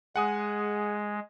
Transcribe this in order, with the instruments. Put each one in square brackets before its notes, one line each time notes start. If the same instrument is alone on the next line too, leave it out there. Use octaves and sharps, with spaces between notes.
[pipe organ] G#3 [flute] G#4 [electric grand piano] F#5 G#5 D#6